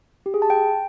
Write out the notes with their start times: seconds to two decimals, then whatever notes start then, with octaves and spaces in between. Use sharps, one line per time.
0.26 G4
0.34 G#4
0.42 A5
0.50 G5